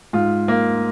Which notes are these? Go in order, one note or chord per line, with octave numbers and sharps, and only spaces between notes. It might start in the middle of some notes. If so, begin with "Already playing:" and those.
G#2 F4
A#3